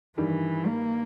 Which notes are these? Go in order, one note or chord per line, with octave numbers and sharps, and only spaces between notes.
G2 D#3 E3 G3
A#3